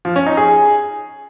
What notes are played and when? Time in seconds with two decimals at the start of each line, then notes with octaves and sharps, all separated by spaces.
0.05 F3
0.16 C#4
0.26 D#4
0.37 G#4